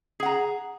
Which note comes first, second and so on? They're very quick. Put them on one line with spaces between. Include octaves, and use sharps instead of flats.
G#4 F#5 A#5